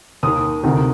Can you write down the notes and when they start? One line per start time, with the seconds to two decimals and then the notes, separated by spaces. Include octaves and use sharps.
0.23 D#2 D#3 D#6
0.63 D2 C3 D#3